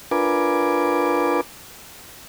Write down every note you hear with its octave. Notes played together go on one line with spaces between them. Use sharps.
D4 F4 A#4 B4 G#5 D6